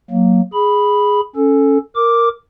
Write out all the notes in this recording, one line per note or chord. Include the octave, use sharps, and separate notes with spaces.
F#3 A#3
G#4 B5
C#4 A4
A#4 D6